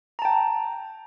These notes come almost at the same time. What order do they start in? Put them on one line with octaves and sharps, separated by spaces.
A#5 A5 G5